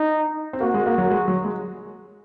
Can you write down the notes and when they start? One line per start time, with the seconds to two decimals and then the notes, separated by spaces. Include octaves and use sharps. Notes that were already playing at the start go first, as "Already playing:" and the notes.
Already playing: D#4
0.53 C4
0.61 A#3 F#4
0.74 G#3
0.86 A#3
0.98 F#3
1.10 G#3
1.28 F#3
1.45 G#3